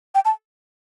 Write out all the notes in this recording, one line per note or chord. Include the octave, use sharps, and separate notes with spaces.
G5
A5